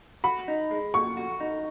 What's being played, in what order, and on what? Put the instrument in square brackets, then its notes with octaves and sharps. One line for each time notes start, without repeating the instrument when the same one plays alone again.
[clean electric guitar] F#4 [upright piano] B5
[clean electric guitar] D#4
G#3
[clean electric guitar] A#2 [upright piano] C#6
[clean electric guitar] F#4
D#4